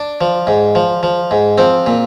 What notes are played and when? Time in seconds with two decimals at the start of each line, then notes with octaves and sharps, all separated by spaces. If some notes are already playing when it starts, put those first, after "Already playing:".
Already playing: D4
0.21 F3
0.47 G#2
0.75 F3
1.03 F3
1.31 G#2
1.58 F3 C4
1.87 A#2